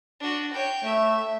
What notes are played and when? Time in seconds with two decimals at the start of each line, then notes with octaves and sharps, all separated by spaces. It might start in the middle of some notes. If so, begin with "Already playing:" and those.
0.20 D4 F#4
0.53 C#5 G5
0.85 A3 E5